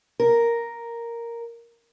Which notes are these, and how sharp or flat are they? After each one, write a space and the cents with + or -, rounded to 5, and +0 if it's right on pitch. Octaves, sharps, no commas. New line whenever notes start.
A#4 +0